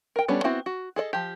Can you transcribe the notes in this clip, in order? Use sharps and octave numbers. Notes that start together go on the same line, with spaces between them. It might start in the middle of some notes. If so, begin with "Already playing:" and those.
A#4 G5
G3 B3 C#4 D4 A4
B3 C4 E4 F#4
F#4
G#4 A4 D5 D#5
F3 G4